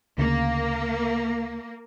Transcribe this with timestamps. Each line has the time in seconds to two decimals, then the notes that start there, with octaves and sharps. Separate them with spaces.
0.18 D2 C#3 A#3